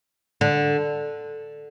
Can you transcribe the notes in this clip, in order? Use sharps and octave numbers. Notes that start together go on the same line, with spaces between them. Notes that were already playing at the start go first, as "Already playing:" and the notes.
D3